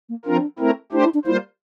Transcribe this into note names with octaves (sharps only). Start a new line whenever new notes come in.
A#3
F3 C4 D4 F4 A#4
A3 C4 E4 A#4
A3 D4 E4 G4 C5
E4
D4
G3 A#3 E4 F4 C5